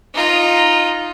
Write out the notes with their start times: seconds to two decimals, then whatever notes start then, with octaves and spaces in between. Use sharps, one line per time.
0.14 D#4 F4